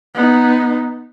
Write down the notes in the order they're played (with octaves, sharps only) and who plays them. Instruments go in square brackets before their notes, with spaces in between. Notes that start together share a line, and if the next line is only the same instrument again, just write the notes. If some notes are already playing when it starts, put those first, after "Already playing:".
[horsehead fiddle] B3 D#4